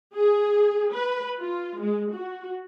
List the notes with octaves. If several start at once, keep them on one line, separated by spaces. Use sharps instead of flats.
G#4
B4
F4
G#3
F#4